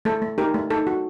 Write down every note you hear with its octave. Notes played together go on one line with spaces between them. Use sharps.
A3 A4
A3
D#4 G4 A#4
A3
D#4 A4
F#4